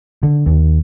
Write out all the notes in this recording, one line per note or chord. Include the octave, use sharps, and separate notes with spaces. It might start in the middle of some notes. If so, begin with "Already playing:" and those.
D3
D#2